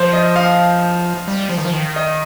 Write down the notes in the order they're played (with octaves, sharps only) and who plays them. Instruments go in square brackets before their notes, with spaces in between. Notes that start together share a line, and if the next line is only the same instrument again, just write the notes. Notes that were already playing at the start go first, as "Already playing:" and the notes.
Already playing: [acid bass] F3 [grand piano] C5
[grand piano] D#5
F5
[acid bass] G3
F3
D#3
F3
D#3
[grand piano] D#5